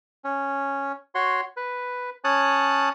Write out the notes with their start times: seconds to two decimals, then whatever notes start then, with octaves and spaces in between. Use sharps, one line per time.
0.24 C#4
1.15 F#4 C#5 C6
1.57 B4
2.24 C#4 C#5 A5 D#6 F#6